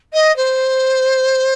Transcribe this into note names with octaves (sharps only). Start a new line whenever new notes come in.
D#5
C5